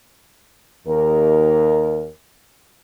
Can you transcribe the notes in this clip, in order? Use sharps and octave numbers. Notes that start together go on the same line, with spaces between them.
D#2 A#4